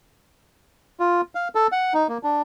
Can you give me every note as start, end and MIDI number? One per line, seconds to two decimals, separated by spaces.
1.00 1.21 65
1.35 1.48 77
1.55 1.67 69
1.72 1.93 78
1.94 2.07 63
2.09 2.18 58
2.23 2.42 62